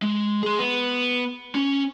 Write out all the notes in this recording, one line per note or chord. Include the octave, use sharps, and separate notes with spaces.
G#3
G#4 C6
B3
C#4